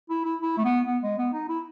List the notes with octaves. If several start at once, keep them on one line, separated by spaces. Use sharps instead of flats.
E4
E4
E4
A3
B3
B3
G#3
B3
D#4
E4